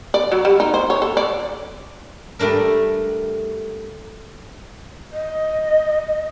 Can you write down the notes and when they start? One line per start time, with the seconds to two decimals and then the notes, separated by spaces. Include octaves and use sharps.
0.14 D5
0.32 F#3
0.45 G3
0.60 D#4
0.74 C5
0.90 C#5
1.02 A4
1.17 D5
2.39 G3 A3 D4 A#4
5.12 D#5